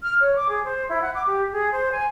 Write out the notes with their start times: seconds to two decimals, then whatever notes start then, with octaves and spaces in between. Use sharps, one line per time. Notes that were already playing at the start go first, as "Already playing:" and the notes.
0.02 F6
0.20 C#5
0.36 D6
0.49 G#4
0.64 C5
0.89 E4
1.02 F#5
1.14 D6
1.27 G4
1.52 G#4
1.72 C5
1.92 G#5